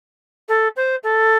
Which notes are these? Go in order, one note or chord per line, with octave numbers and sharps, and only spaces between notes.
A4
C5
A4